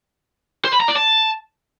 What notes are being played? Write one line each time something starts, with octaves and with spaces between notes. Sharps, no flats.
C5
B5
A#5
D5
A5